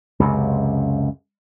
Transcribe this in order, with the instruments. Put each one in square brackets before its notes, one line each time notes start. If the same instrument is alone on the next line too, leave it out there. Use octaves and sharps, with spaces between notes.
[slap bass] C#2 F#2 C3